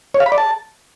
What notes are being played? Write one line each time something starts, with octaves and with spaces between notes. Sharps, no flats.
C#5
F5
B5
D5
A5